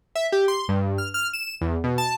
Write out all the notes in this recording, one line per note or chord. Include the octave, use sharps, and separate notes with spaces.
E5
G4
C6
G2
F6
F6
E7
E2
B2
A5